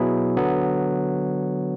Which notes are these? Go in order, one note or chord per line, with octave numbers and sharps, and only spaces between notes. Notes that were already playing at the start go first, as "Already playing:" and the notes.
Already playing: B2 F#3 B3 E4 G#4
D3 F#3 B3